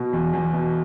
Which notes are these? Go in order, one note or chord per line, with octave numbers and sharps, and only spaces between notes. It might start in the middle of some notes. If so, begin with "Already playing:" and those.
Already playing: B2
E2
E2
B2